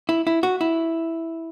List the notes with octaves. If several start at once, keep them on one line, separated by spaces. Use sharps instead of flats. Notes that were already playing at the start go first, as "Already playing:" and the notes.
E4
E4
F#4
E4